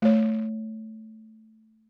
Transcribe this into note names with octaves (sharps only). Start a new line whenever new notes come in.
A3 C#5